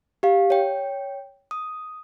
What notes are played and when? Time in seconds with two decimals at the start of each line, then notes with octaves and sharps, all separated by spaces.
0.23 G4 F5
0.50 C#5 G5
1.51 D#6